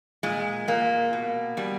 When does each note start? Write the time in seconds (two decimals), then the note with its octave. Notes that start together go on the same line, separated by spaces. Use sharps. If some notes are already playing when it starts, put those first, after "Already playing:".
0.23 A#2 G#3
0.68 A#2 A#3
1.13 B2
1.57 B2 G3